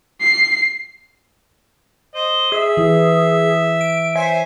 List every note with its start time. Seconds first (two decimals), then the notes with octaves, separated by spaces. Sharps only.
0.21 C7
2.15 C5 D#5
2.52 G#4 E5
2.77 E3 E4
3.81 D7
4.16 C5 C#5 E5 G#5